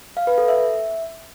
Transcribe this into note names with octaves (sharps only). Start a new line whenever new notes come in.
F5
B4
A4
E5